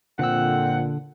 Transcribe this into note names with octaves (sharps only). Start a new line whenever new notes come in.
F2 A#2 D3 C4 F#5 E6